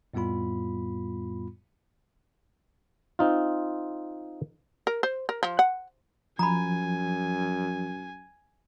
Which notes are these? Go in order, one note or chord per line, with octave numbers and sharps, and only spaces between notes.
F2 A2 G3 B3 F4 B5
C4 D#4 F4
A#4
C5
A#4
F3
F#5
F#2 F3 G#5 A#5 B5